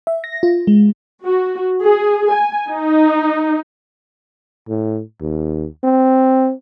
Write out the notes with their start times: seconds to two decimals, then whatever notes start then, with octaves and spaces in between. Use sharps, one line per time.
0.07 E5
0.24 A#6
0.43 F4
0.67 G#3
1.25 F#4
1.82 G#4
2.32 G#5
2.69 D#4
4.69 A2
5.21 D#2
5.84 C4